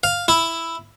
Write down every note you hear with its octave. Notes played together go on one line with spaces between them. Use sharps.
F5
E4